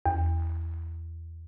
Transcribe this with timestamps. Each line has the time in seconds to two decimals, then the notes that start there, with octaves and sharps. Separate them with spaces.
0.06 E2